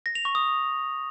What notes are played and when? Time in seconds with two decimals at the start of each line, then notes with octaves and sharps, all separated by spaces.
0.06 A#6
0.15 F7
0.25 C#6
0.35 D#6